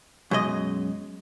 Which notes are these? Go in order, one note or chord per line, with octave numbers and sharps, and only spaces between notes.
F#2 B2 G#3 D#5